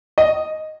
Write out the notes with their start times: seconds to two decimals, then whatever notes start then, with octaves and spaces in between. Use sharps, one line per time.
0.18 D#5